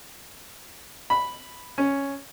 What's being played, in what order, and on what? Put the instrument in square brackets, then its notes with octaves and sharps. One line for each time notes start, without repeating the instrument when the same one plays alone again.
[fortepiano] B5
C#4